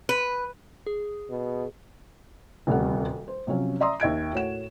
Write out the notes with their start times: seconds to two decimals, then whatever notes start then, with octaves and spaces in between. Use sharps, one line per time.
0.09 B4
0.87 G#4
1.30 B2
2.67 D#1 D2 C3 G3 F#5
3.28 C5
3.47 C3 F3 F#3 C#4
3.80 D5 E5 A#5 C6 D#6
4.00 D#2 E5 G#6 D7
4.33 A2 F#4 C#5 F#5 E7